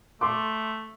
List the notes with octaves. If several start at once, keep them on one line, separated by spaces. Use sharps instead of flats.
A3 C6 D6